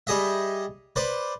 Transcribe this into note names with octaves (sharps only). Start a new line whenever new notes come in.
G3 G#4 D#5 E5
B4 C5 D5